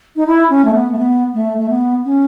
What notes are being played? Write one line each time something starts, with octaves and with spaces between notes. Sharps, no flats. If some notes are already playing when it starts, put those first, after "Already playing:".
D#4
E4
C#4
A3
B3
A3
B3
A3
A3
B3
C#4